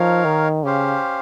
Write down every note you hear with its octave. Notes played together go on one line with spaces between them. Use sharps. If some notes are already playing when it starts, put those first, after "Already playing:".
Already playing: F3 D#4 A#4 C#5 F5
D#3
C#3 C#4 G4 C5 F5